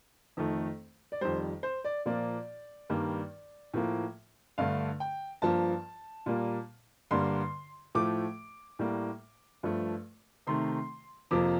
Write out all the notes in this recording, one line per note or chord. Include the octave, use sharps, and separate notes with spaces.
F2 D#3 A3
D5
F2 D#3 G3 C5
C5
D5
A#2 F3 A#3 D5
G2 D#3 G3 A#3
A2 F3 A#3
G2 D3 A3 F5
G5
G2 F3 A#3 A5
A#2 G3 A#3
G2 D3 G3 A#3 C6
A2 F3 A3 D6
A2 G3 A#3
G2 F3 A3
C3 D#3 A3 C6
F2 C3 F3 A#3 D6